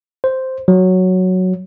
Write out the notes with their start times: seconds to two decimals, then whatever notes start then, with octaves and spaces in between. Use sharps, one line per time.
0.24 C5
0.68 F#3